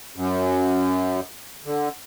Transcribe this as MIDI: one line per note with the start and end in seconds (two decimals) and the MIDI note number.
0.16 1.20 42
1.65 1.89 50